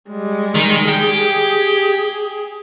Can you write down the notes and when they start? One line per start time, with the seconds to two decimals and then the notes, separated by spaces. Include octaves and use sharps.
0.10 G3 G#3
0.55 D#3
0.88 G4 G#4